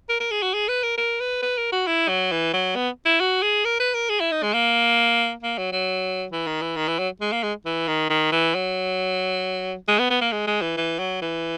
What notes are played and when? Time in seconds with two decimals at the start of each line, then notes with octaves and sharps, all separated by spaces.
0.09 A#4
0.20 A#4
0.31 G#4
0.42 F#4
0.53 G#4
0.68 B4
0.83 A#4
0.97 A#4
1.20 B4
1.42 B4
1.57 A#4
1.72 F#4
1.87 E4
2.08 F#3
2.31 E3
2.53 F#3
2.76 B3
3.05 E4
3.20 F#4
3.43 G#4
3.65 A#4
3.80 B4
3.94 A#4
4.09 G#4
4.20 E4
4.31 D#4
4.43 G#3
4.54 A#3
5.43 A#3
5.58 F#3
5.72 F#3
6.32 E3
6.47 D#3
6.62 E3
6.76 D#3
6.88 E3
6.99 F#3
7.21 G#3
7.32 A#3
7.43 G#3
7.65 E3
7.88 D#3
8.10 D#3
8.32 E3
8.54 F#3
9.88 G#3
9.99 B3
10.10 B3
10.21 A#3
10.32 G#3
10.47 G#3
10.62 E3
10.77 E3
10.99 F#3
11.22 E3